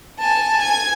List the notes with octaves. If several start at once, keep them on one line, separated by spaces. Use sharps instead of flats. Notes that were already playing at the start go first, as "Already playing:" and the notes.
G#5 A5
G#5 G#6